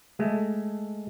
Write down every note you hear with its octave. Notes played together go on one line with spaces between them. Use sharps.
G#3 A3